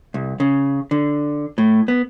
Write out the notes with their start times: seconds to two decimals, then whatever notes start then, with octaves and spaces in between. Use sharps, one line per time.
0.14 C2
0.40 C#3
0.91 D3
1.58 A2
1.88 B3